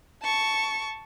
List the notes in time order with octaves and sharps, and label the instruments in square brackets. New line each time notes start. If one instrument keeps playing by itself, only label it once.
[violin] A5 C#6